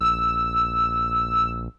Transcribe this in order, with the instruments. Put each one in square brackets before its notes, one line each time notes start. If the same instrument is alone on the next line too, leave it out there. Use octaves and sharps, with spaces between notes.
[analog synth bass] A#1 [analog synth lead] E6